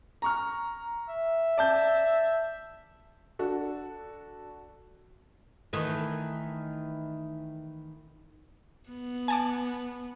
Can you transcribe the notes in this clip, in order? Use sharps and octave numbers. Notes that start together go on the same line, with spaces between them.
A#5 C#6 F6
E5
D5 A5 G6
D4 F#4 A4
D#3 E3 A3
B3
G#5 A5 D6